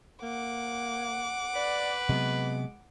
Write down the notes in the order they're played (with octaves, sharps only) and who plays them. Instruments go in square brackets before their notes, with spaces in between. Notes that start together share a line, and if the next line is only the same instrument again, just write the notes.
[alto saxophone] A#3 [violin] F#5 D6
[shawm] B4 [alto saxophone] D5
[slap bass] C3 F#3 B3 [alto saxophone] G#3